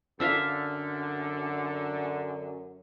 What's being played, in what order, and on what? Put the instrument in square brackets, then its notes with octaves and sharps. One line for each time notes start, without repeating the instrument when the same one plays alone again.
[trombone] F#2 [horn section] D3 [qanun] D4 E5 F5 [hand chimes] E6 F6 B6